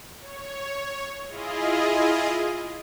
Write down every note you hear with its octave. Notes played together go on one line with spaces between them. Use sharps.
C#5
E4 F4 G#4 D#5